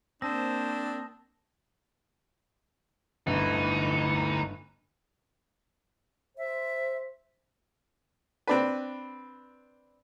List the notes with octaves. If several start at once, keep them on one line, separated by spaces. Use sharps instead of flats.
A#3 C4 D4 C5 A5 D#6 A#6
G1 D2 E3 D#4
C5 E5
C4 D4 B4